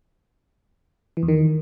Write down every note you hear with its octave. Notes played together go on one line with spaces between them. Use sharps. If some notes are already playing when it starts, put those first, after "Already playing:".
E3
E2
D#3